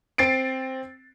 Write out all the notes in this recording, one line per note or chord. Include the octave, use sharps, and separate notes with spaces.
C4 A6 C7 D7